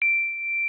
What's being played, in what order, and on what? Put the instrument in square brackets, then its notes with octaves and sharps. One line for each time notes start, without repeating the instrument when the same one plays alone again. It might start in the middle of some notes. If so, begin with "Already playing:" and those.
[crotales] D7